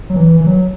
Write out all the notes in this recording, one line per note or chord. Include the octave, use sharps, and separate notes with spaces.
F#3
E3
E3
F#3